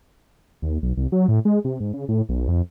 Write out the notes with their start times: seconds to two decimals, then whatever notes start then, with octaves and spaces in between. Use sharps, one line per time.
0.62 D#2
0.83 B1
0.97 C2
1.12 F#3
1.28 A2
1.45 G#3
1.65 C3
1.80 G#2
1.94 C#3
2.08 A2
2.29 B1
2.48 F2